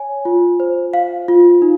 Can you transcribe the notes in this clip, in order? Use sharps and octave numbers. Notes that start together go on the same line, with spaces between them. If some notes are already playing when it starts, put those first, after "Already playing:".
Already playing: C#5 G#5
F4
C5
F5
F4
D#4